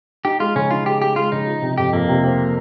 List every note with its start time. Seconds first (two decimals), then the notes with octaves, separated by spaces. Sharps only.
0.24 D#4 G4
0.40 G#3 F4
0.56 C#3 C#4
0.71 D#4 F4
0.86 G4 G#4
1.02 G#3 G4
1.16 G#3 F4
1.32 C#3 D#4
1.46 F3
1.62 C3
1.78 F2 G4
1.93 F2 A#3
2.08 C3
2.23 C4